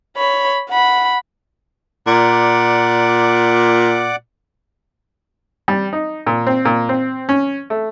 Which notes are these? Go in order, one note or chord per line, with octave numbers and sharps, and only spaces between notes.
C#5 B5
F#5 B5
A#2 D5 F#5 D6
G3
D#4
A#2
C4
A#2
C4
C#4
A3